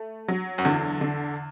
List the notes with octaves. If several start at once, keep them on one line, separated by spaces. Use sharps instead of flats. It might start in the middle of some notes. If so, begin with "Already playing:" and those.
Already playing: A3
F#3
F#2
E2 D3
D3